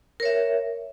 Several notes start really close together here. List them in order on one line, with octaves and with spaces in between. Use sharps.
A#4 C#5 E5